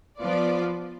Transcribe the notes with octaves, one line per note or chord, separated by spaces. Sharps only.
F3 B3 F4 B4 D5